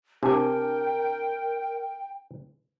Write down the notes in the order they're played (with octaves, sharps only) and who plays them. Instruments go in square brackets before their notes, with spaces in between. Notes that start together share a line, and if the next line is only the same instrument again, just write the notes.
[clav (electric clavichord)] C3 [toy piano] D4 A5 D6 [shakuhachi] A#4 [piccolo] G5